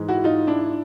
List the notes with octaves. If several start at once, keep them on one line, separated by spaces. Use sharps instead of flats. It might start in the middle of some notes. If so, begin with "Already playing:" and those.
Already playing: G#2 E3 G#3
E4 F#4
D#4 F4
D4 E4